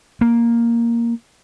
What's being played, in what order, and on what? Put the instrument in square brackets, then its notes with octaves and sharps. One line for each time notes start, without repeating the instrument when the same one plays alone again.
[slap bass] A#3